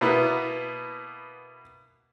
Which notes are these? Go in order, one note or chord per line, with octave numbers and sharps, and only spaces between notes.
B2 A#3 B3 E4